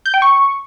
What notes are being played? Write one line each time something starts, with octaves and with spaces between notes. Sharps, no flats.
G6
G5
C#6